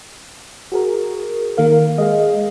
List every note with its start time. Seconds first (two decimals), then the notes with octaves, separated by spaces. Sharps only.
0.72 F#4 G#4 A#4
1.58 D#3 A#3 A#4 F5
1.98 G#3 D#5 F5